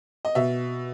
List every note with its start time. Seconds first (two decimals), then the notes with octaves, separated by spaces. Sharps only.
0.25 D#5
0.35 B2 E5